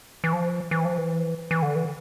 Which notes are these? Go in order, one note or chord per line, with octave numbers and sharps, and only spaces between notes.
E3
F3
E3
F3
E3
E3
D3
E3